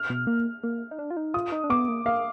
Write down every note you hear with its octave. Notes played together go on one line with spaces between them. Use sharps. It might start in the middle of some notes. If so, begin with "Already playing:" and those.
Already playing: F6
B2
A#3
A#3
D#4
D4
F4
D#4
F4 D#6
D#4
D4
B3 D6
A#3
A#3 F5